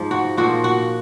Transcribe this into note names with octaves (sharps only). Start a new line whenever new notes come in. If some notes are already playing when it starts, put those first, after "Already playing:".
Already playing: G#2 F3
F#4
A#2 F3 F#4
F#4